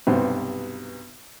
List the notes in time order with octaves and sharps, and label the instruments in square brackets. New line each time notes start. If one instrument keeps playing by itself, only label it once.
[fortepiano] B1 G2 C3 B3 C5